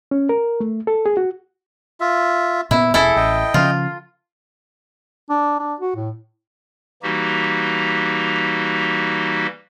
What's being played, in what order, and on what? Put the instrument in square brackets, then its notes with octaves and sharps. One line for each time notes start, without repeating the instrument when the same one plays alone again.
[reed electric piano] C#4
A#4
A3
A4
G#4
F#4
[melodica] F4 E5
[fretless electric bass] A#2 B3 [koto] E4
[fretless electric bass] E1 [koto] E4 A4 [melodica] G#4
[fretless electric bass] A1 [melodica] D#5 G5
[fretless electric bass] C#3 F3 C#4 [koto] F4
[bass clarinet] D4
D4
F#4
A2
[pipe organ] E3 G3 A#3 D#4 F#4 G4